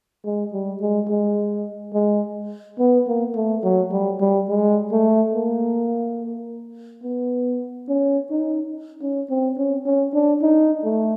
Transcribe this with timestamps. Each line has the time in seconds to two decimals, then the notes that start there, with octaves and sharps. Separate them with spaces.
0.25 G#3
0.53 G3
0.82 G#3
1.09 G#3
1.94 G#3
2.79 B3
3.07 A#3
3.36 A3
3.64 F#3
3.92 G3
4.20 G3
4.49 G#3
4.92 A3
5.34 A#3
7.03 B3
7.88 C#4
8.31 D#4
9.01 C#4
9.30 C4
9.58 C#4
9.86 C#4
10.14 D4
10.42 D#4
10.84 A3